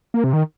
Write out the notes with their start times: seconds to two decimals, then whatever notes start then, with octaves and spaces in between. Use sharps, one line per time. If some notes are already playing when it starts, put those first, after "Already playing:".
0.14 A#3
0.24 C3
0.33 D#3